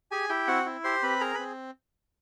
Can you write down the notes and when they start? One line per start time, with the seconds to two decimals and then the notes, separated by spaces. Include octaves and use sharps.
0.11 G4 G#4 G#5
0.29 E4 G4 G5
0.47 C4 F#4 F#5
0.66 E4
0.84 G4 C5 C6
1.03 C4 B4 B5
1.20 G#4 A#4 A#5
1.34 C4 B4 B5